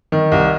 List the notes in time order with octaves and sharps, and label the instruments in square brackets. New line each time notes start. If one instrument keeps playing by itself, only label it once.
[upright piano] D#3
C2